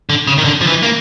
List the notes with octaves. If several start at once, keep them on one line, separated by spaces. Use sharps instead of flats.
D3
C#3
D#3
D3
F3
E3
A#3